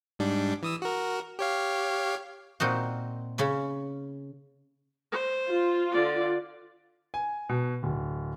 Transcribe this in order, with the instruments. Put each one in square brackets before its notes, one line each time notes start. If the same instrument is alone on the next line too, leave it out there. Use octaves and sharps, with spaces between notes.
[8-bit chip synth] G#2 G3 D4
E3 D#6 E6
F#4 A#4
G4 C#5 F5
[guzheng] A#2 C4 D#4 F#4
C#3 C#4 B5
[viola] C5
[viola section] F4
[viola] D3 D5
[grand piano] G#5
B2
D1